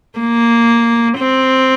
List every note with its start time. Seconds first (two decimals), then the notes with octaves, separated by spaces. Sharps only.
0.19 A#3
1.18 C4